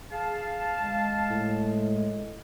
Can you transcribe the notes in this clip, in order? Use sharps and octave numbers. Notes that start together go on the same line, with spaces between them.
G#4 F5 A5
G#3
A2